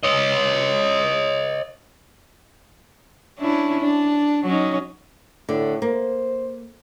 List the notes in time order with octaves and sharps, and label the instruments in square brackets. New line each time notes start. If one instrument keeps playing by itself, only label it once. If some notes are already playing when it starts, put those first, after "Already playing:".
[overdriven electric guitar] C#5 D#5
[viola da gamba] C#4 D4 E4
D4
F#3 C#4 D#4
[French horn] A2 [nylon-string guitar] D3
[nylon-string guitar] A#3 [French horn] C5